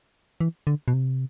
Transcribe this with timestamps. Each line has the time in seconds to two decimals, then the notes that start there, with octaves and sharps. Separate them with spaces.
0.41 E3
0.67 D3
0.88 B2
0.94 C3